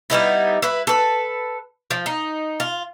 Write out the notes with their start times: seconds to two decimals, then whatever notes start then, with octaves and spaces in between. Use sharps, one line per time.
0.10 G3 B3 D#4 E4
0.62 E4 B4
0.87 A4 B4
1.91 F3
2.06 D#4
2.60 F4